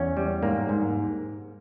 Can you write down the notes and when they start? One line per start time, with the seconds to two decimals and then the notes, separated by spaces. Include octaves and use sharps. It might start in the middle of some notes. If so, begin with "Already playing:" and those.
Already playing: E2 C#4
0.17 G3
0.43 G#2 A#3
0.69 G#2